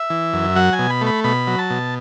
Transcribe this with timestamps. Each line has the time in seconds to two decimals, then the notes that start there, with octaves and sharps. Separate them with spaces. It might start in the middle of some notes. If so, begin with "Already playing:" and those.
Already playing: E5
0.10 E3
0.33 F#2
0.56 F#3 F#5
0.73 G#5
0.79 B2
0.90 B5
1.01 A3
1.07 B5
1.24 B2 B5
1.47 F#3
1.59 A5
1.70 B2